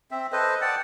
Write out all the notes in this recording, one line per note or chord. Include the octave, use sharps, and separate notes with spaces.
C4 E5
A4 B4 C5 D#5
D5 F#5 G5 A5